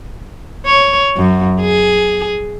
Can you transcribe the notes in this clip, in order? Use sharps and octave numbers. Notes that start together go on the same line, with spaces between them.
C#5
F#2
G#4